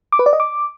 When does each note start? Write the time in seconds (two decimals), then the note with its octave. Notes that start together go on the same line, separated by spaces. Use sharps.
0.12 D6
0.19 B4
0.26 D5
0.33 D#5
0.40 D6